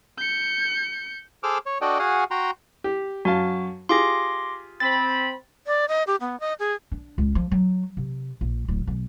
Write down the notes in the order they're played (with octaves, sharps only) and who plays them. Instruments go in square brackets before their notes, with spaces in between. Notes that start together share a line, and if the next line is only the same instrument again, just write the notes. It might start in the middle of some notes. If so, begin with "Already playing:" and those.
[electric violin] G6 C#7
[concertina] G#4 A4 C5 D6 E6 F6
C#5
D4 F#4 A4 D5 D#5 G5
F#4 G#4 F5 F#5 G#5
F#4 G5 A#5 C6
[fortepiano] G4
[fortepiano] F#2 F5 A5 [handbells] F#4
[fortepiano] F4 G4 G#4 [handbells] C6 D6 A#6
[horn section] C4 B5 [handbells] A6
[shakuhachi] D5
D#5
G4
B3
D#5
G#4
[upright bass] D4
C#2
F3
F#3
C3
A#1
D1
B1